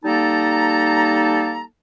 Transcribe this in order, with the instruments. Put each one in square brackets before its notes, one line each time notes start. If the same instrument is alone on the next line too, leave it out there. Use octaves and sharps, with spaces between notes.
[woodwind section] G3 A#3 D#4 A4 A5 A#5